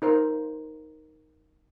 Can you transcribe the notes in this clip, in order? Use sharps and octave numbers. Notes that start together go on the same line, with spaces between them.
D#4 A#4 C5